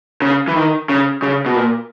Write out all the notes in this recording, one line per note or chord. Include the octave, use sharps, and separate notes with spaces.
C#3
E3
D#3
C#3
C#3
B2
A#2